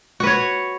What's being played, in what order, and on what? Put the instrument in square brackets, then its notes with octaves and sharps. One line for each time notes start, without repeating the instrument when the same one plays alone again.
[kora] F#4
B4
C#5